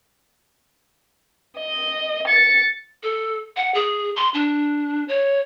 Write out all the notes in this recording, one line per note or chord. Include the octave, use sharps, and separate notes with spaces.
D#5
A6 C#7
A4
F#5
G#4
C6
D4
C#5